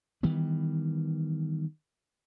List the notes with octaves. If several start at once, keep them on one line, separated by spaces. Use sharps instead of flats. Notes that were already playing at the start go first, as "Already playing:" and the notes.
D#3 E3 G3 B3